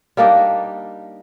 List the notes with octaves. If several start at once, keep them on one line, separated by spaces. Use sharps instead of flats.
G3 A#3 D4 D#4